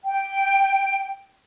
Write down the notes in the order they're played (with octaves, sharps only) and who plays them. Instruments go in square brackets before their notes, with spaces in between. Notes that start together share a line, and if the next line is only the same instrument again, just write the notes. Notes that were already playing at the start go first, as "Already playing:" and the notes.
[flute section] G5